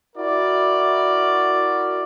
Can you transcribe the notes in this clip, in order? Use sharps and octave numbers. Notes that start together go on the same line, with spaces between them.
E4 F#4 A#4 D5